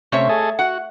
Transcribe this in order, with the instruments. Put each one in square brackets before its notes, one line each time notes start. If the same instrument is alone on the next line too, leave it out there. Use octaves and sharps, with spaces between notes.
[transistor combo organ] C3 C#4 [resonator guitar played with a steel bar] A3 C#5 E5
[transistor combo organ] G#4 A4 D#5
[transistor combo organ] F#4 [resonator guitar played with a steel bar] F#5